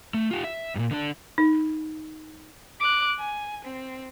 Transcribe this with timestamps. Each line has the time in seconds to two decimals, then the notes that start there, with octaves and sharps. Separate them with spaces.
0.14 A3
0.31 F4 G4
0.44 E5
0.75 G2 A#2
0.91 D3 D4
1.38 D#4
2.80 D6 F#6
3.19 G#5
3.65 C4